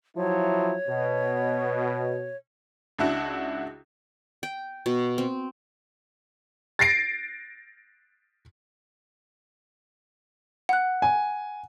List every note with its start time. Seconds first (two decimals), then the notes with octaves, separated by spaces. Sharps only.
0.17 F3 F#3 E4 C#5
0.88 B2
2.98 C#2 D4 E4 F#4
4.43 G5
4.86 B2
5.18 C4
6.79 A6 A#6 C7 D7
10.69 F#5 F#6
11.02 G#5